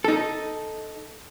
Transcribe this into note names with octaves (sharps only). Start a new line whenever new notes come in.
D#4 A4